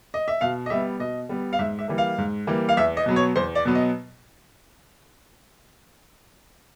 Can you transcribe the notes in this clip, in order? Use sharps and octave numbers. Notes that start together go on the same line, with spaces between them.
D#5
E5
B2 F5
D#5
G3 B3 E5
B2 D#5
G3 B3
F5
G#2 E5
E5
E3 G3 A#3
F5
G#2
E3 G3 A#3
F5
E2 E5
D#5
B2 F#3 B3
C#5
E2 C5
D5
B2 F#3 B3
D#5